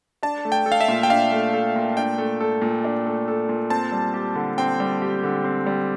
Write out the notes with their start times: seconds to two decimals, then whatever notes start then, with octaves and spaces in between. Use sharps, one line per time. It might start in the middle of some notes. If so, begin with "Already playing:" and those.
0.23 D4 A5
0.45 A3
0.52 G5
0.66 A4
0.72 F5
0.81 E5
0.88 A#2
1.03 G5
1.10 D4 F5
1.32 A3
1.53 A4
1.76 A#2
1.97 D4 G5
2.18 A3
2.40 A4
2.61 A#2
2.84 D4
3.06 A3
3.28 A4
3.49 A#2
3.70 C4 A5
3.92 G3
4.14 G4
4.35 D3
4.58 C4 G5
4.80 G3
5.02 G4
5.23 D3
5.44 C4
5.66 G3